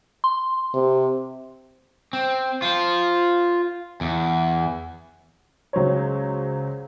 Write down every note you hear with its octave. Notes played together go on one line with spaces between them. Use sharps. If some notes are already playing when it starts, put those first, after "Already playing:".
C6
C3
C4
F4 C5
E2
C#2 F#3 C5 C#5